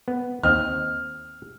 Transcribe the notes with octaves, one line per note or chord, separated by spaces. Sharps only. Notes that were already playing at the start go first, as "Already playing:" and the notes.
B3
D#2 C4 D#5 F6